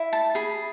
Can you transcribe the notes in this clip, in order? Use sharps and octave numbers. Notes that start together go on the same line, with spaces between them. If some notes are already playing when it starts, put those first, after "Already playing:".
Already playing: E4
A5
G#4 B5